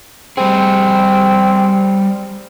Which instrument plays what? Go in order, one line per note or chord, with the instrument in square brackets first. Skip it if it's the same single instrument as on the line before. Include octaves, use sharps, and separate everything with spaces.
[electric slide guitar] G3 G#4 [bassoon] C4